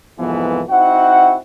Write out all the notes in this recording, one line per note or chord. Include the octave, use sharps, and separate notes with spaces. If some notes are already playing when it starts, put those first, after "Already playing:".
C2 F2 G#2 E3 F3 B3
C4 D#4 E4 F#4 F#5